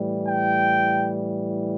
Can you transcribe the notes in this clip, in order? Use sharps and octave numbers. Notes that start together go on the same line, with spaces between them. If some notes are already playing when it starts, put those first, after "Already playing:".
Already playing: A2 E3 G3
G5